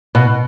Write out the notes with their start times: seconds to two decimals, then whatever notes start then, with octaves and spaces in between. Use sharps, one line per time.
0.15 B2